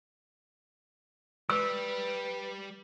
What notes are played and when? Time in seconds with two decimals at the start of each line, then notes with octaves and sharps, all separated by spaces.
1.50 G3 B4 E6